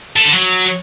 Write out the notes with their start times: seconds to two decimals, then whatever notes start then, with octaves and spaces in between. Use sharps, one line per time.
0.16 A3
0.25 D3
0.33 F#3